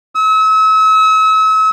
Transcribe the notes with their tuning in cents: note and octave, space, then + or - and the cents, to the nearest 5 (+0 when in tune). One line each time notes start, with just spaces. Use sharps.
E6 -40